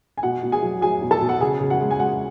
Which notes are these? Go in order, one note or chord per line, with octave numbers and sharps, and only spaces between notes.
G#5
B2 F#4 F#5
B2
G#4 G#5
F#3
F#3 G#4 G#5
B2
A4 A5
B2
F#5
C#3 G#4 G#5
C#3
F#4 F#5
G#3
G#5
G#3 F#4 F#5